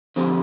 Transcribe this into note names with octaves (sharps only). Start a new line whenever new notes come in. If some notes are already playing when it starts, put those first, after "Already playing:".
D3 F3 C4 G4